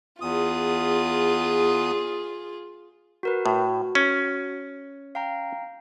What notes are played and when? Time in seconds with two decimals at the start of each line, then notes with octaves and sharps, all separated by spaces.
0.21 E2 F4 G#4 D#6
3.23 F#4 A#4 B4
3.46 A2 F#4
3.95 C#4
5.15 F5 G5 A#5